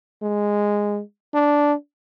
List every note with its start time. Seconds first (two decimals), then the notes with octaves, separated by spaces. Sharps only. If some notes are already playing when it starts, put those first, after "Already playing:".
0.22 G#3
1.34 D4